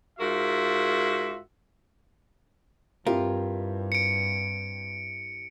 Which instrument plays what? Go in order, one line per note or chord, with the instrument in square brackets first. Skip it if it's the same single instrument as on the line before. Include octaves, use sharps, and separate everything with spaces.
[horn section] G#2 F4 F#4 A#4 E5
[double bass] G2 [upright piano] C4 E4 G4 [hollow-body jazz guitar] F4 A#4
[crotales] C#7 D7